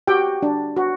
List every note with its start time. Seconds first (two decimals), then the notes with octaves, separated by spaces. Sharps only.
0.07 F#4 G4 G5
0.43 D4
0.76 F#4